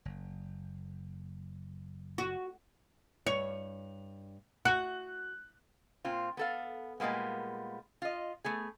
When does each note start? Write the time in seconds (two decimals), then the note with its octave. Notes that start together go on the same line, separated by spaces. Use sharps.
0.05 F#1
2.18 F#4
3.27 G2 C#5 F7
4.65 F#4 F#6
6.05 A#2 C4 F4
6.37 B3 A4 F5
7.00 A#2 G3 G#3 A#3 B3
8.02 F4 D#5
8.45 A3 B3 G#4